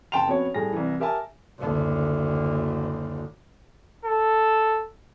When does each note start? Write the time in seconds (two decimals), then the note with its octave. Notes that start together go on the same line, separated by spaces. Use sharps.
0.12 F#1 G5 A5 C6 F7
0.27 F2 B3 C#4 F#4 C#5
0.54 A2 G3 G#4 A#6
0.73 C2 E3
1.00 G4 A#4 E5 G#5 A5
1.59 F#1 D2
4.05 A4